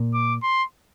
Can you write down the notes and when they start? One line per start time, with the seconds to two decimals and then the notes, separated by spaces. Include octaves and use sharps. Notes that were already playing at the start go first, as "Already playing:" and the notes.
Already playing: A#2
0.14 D6
0.43 C6